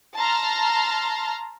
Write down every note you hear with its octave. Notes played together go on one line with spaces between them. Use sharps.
A5 A#5 C6 F6